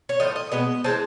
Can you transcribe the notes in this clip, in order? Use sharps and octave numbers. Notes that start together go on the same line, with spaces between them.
C#5
A2 F3 D#5
D#5
B2 G#3 B3 D#5
E3 G#3 C4 A5